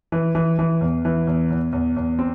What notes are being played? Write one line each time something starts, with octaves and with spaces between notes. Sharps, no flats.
E3
E3
E3
E2
E3
E2
E2
E2
E2
C4